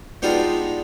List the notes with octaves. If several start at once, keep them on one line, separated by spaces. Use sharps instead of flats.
G#3 B3 D4 D#4 F4 G4